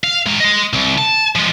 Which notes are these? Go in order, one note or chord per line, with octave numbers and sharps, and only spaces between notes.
F5
G#3 A#4
D#5 C6
C2
A5
F3 G#3